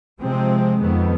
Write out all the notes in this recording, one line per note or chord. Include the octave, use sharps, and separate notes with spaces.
C3 F3 G#3 C4
F2 D#3 B3